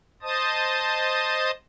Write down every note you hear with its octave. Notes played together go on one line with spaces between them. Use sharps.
C5 D#5 A5 D#6